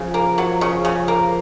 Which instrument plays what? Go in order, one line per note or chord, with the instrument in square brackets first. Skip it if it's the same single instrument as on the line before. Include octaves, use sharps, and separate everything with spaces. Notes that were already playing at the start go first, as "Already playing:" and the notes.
Already playing: [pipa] C#3 [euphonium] F3
[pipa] A#3
F#3
C#3
C#3
A#3